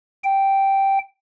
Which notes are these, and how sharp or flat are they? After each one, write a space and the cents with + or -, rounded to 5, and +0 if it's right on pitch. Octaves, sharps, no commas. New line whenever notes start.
G5 -5